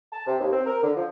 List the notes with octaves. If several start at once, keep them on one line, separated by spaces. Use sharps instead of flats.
A5
C3
D#2
C4
A#4
D3
F3